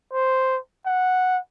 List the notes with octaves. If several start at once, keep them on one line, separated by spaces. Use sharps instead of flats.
C5
F#5